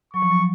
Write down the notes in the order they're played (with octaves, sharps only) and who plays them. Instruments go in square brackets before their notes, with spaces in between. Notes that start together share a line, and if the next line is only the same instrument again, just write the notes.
[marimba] F#3 [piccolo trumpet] C#6
[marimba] F3
F#3